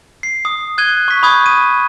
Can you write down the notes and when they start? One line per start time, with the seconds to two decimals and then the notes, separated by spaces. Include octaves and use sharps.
0.23 C7
0.45 D#6
0.78 F#6 G#6 D#7 G7
1.08 C#6 B6
1.23 B5 C#6 D#6 G6 G#6
1.46 D#7